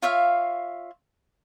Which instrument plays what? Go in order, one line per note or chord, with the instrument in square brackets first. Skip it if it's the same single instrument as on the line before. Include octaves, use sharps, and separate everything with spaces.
[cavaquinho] F4 C#5 E5 F5